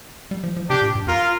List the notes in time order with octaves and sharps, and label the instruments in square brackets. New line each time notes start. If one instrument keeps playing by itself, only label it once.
[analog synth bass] G3
F3
F3
[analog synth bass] C3 [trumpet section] D4 G4
[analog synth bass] A#2
G2
[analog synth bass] F2 [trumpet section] F4 A#4